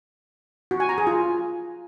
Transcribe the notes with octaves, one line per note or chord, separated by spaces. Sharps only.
F#4
G#5
A#5
G#4
F4